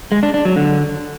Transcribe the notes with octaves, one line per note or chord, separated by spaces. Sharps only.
G#3
D4
D4
F#3
D3